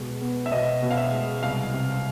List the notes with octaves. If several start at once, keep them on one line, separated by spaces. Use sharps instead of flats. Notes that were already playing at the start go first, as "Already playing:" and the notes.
Already playing: B2 G#3
B3
E5
B2 D#5
B2
F5
E5
G#3
C2 F5
C3